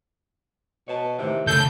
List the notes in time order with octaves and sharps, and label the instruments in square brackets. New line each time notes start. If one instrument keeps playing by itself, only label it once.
[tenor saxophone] B2 [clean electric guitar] C#5 A5
[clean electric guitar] A2 D#3 E3 [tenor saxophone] C3
[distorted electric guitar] C#3 E3 [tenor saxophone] A4 [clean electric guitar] C#5 A5 [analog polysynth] G6